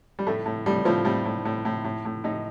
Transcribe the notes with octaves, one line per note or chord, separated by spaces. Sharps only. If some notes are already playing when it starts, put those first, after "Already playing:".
G3
A2 A3
A2
A2 G3
A2 F3
A2 G3
A2
A2
A2
A2
A2
A2 D#4